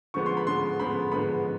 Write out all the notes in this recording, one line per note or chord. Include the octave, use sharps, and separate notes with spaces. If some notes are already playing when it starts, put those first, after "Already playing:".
D3 F3 G#3 B3 C#6
C6
B5
D3 F3 G#3 B3 C6
D3 F3 G#3 B3 B5
D3 F3 G#3 B3 B5